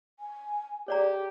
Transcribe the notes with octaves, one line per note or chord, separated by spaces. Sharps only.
G#5
G4 G#4 C#5 D5 A#5